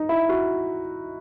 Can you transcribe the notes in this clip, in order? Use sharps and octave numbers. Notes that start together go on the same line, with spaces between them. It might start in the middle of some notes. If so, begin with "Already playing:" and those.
Already playing: D#4
E4
F#4